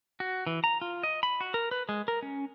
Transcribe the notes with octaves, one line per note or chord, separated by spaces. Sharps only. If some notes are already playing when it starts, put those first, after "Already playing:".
F#4
E3
A#5
F4
D#5
B5
F#4
A#4
B4
G#3
A#4
C#4